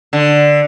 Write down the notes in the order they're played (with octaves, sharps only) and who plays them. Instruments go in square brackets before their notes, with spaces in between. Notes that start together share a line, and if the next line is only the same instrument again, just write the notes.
[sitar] D3